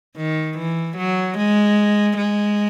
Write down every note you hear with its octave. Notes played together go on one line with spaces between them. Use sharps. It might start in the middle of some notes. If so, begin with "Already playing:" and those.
D#3
E3
F#3
G#3
G#3